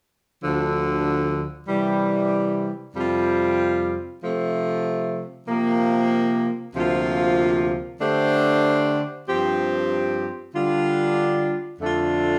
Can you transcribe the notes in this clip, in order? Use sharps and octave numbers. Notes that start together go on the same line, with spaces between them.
D2 D3 F3
C3 E3 G3
F2 C3 G3 C4 F4
C3 F3 A3
C3 F3 A#3
D2 C3 F3 A#3 F4
D3 A3 D4 G4 C5
G2 F3 C4 G4
D3 G3 D4 F4
F2 D3 A3 D4 F4